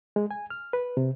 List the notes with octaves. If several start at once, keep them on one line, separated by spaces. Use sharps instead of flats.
G#3
G#5
F6
B4
C3